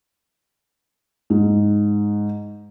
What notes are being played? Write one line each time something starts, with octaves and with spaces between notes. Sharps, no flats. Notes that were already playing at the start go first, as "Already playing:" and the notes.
G#2